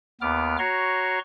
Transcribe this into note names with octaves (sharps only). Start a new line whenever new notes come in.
D#2 B3 D6 F6
F#4 C#5 A#5 C6 C#6